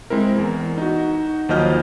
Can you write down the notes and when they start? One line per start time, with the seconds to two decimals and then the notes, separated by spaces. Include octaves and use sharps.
0.10 G#3 C4 E4 A#4
0.38 E2
0.78 D#4 F#4
1.49 D#2 F3 F#3 D#5 F6 G6